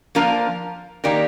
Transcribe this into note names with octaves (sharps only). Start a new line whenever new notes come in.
F3 A#3 D4 F4 A#4
D#3 A#3 D#4 G4 A#4 D5